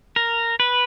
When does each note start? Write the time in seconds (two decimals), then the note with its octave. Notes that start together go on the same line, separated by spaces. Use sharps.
0.16 A#4
0.60 B4